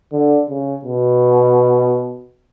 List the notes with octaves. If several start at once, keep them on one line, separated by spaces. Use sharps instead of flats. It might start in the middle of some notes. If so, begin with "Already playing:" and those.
D3
C#3
B2